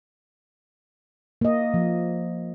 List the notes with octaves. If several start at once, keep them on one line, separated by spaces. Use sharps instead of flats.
A#3 D#5
F3